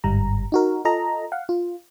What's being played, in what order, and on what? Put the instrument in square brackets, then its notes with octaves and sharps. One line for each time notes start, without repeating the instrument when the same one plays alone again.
[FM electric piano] G1 G#2 G3 A#5
D#4 F#4 A#4
F4 A4 D#5 A#5
F5 F#5
F4